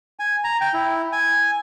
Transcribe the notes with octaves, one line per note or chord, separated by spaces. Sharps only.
G#5
A#5
G5
E4
G#5